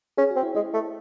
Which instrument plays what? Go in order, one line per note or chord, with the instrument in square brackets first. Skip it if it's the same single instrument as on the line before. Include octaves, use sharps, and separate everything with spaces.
[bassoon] C#4 [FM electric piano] G#4
[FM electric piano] F#4
[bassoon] C4
[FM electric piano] E4
[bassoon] G#3 [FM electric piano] E4
[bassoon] A3